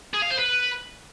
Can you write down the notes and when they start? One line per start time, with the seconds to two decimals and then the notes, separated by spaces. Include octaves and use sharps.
0.14 G#4
0.22 F5
0.30 C5
0.38 B4